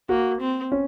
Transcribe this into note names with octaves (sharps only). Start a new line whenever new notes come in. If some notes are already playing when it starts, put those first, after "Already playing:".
A#3 F#4
C4
C#4